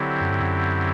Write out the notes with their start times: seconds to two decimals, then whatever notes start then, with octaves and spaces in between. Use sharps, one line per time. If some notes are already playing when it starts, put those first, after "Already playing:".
Already playing: D3 F#3 C4 E4 G4
0.21 F#2
0.31 G2
0.40 F#2